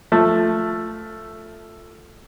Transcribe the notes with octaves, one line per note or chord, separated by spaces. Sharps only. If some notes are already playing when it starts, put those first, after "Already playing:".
F3 A3